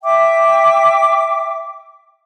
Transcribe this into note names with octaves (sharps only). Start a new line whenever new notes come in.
E5 G5 D6